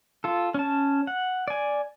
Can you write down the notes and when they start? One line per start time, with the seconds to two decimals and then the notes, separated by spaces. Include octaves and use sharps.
0.24 F4 A4
0.54 C#4 A5
1.07 F#5
1.48 D5 G#5